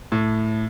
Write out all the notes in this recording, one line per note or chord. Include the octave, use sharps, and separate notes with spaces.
A2